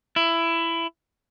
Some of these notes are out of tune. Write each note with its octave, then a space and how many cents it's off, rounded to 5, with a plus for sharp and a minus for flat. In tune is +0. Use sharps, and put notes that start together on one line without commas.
E4 +15